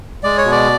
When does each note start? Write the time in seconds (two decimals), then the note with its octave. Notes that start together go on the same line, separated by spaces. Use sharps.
0.23 G#3 D5
0.37 C#5
0.45 B2
0.51 D5